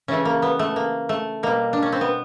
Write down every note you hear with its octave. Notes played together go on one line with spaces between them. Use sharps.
C#3 E3 A3 C#4
A#3
B3
A3
A#3
A3
B2 G3 A#3
D4
C#4
C4
B3